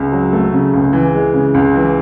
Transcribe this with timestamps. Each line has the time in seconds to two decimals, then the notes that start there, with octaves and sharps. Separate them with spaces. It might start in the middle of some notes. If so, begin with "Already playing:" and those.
Already playing: C#2
0.12 F#3
0.33 A3
0.52 C#3
0.73 C#2
0.93 E3
1.14 G#3
1.34 C#3
1.54 C#2
1.75 E3